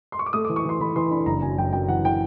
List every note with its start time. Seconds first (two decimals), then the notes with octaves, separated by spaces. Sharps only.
0.12 C6
0.19 C#6
0.26 D6
0.33 A3 D#6
0.45 E3 D6
0.56 C#6
0.65 E3 C6
0.80 E3 B5
0.96 E3 C6
1.11 D4 B5
1.26 F#1 A#5
1.42 F#2 G#5
1.57 F#2 G5
1.73 F#2 G5
1.89 E3 F#5
2.04 E3 G5